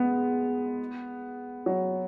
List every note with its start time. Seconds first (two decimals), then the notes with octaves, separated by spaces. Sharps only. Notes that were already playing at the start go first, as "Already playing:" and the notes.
Already playing: G#3 B3
1.66 F#3